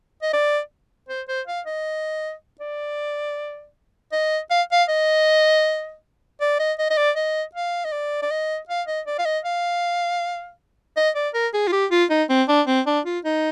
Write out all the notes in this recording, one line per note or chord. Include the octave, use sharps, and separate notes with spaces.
D#5
D5
C5
C5
F5
D#5
D5
D#5
F5
F5
D#5
D5
D#5
D#5
D#5
D5
D#5
F5
D#5
D5
D5
D#5
F5
D#5
D5
F5
D#5
F5
D#5
D5
A#4
G#4
F4
G4
F4
D#4
C4
D4
C4
D4
F4
D#4